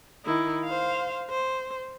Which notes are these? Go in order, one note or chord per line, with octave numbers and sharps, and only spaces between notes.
D#3 E4
C5 F5
C5